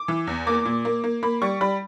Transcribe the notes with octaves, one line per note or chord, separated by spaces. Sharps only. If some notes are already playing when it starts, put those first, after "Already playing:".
Already playing: D6
E3
E2
A#3 D6
A#2
A#3
A#3
A#3 B5
G3 C#6
G3 B5